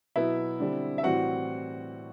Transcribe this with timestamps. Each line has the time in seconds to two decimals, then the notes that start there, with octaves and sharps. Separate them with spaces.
0.16 B2 F#3 B3 E4 E5
0.60 D3 G3 C4
0.98 E5
1.03 A2 E3 G3 C4 F#4 F#5